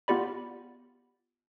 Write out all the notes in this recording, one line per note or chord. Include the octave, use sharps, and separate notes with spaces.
B3 F4 G4 D5 B5